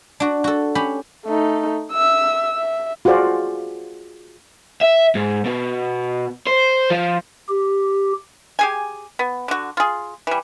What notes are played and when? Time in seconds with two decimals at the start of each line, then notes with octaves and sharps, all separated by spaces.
0.20 D4 F#4
0.44 F#4 A4
0.75 C#4 G4 B5
1.25 A3 D#4
1.92 E5 E6
2.58 E5
3.05 F4 F#4 G#4 C5 D5
4.81 E5
5.15 G#2
5.45 B2
6.47 C5
6.90 F3
7.48 G4
8.59 G4 G#4 G#5
9.19 B3
9.48 D3 F#4
9.77 F4 G#4
10.27 E3 G3